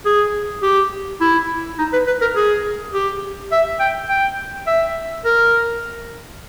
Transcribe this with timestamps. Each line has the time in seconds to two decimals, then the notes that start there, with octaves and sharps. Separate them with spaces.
0.05 G#4
0.62 G4
1.21 E4
1.79 D#4
1.93 B4
2.07 B4
2.21 A#4
2.36 G#4
2.93 G4
3.52 E5
3.80 G5
4.09 G5
4.67 E5
5.25 A#4